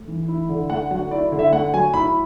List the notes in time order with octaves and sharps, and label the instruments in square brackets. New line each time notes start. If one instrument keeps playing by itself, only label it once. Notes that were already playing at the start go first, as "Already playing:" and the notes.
Already playing: [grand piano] A3
E3
E4
D3
A3 F#5
F#3 F#5
E4 D5
D3
E5
A3 F#5
F#3 G#5
E4 B5